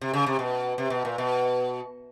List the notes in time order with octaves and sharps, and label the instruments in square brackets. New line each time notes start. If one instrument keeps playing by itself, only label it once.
[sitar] C3
C#3
C3
B2
C3
B2
A#2
B2